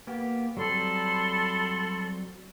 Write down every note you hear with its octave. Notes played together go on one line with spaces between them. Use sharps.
A#3 B3 G4
F#3 G3 C4 A4 B5 C6